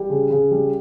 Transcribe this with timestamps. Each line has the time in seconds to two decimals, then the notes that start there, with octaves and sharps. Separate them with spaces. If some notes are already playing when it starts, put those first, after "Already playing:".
Already playing: G3
0.10 C#3
0.30 C#3
0.51 G3